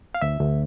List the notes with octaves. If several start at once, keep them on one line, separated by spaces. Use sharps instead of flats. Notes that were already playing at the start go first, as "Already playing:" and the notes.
F5
D2 E5
D2